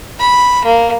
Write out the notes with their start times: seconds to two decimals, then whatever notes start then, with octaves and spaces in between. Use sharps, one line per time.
0.20 B5
0.65 A#3